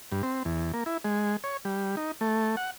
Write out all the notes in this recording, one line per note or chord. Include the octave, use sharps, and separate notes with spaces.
G2
C4
E2
A#3
E4
G#3
C#5
G3
D#4
A3
F#5